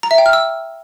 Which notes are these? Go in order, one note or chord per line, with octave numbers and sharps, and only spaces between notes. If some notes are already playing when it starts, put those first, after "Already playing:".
A#5
E5
G5
F6
E6